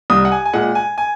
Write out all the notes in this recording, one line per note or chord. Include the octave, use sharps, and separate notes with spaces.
C2 D#6
F#5
G#5
G#5
A#2 G#3 F#5
G#5
G#5